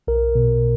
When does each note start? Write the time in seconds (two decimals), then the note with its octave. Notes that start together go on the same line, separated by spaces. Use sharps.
0.08 B1 A#4
0.35 B2